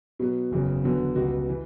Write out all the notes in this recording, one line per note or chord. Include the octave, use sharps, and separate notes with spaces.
B2 F#3 B3
F#1 E2 C#3 F#3
E2 D3 F#3 B3
C#2 B2 G3 B3 F#4
E3